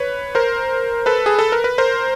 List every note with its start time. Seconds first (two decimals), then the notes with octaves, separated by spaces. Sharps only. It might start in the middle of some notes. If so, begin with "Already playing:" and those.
Already playing: B4 C#5
0.35 A#4 C5
1.06 A4 B4
1.26 G#4
1.39 A4
1.52 A#4
1.64 B4
1.78 A#4 C5